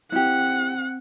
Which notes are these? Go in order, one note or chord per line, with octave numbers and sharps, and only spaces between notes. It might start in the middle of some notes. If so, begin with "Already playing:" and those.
C4 E4 G4 F#5